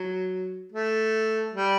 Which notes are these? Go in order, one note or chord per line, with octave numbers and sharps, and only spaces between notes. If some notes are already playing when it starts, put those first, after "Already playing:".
Already playing: F#3
A3
G3